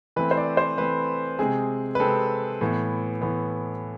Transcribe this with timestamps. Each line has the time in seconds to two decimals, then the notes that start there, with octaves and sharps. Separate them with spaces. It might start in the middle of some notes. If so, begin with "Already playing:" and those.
0.16 E3 A3 C4 B4
0.31 C5
0.37 D5
0.57 C5
0.78 E3 A3 C4 B4
1.39 C3 G#3 C4 G#4
1.95 B4
2.00 C3 G#3 C4 A4
2.61 A2 E3 B3
3.21 A2 E3 B3